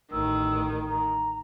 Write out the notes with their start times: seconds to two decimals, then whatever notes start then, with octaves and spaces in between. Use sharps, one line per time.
0.12 A1 D#3 E6
0.88 A#5